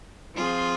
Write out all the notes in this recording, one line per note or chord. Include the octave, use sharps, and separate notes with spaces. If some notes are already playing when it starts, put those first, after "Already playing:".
F3 C4 F4 G#4